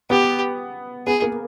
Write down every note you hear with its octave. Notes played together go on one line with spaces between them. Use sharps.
B3 G4
B3 G#4
A#3